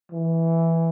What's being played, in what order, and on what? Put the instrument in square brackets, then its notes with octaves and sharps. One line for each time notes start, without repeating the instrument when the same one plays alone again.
[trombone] E3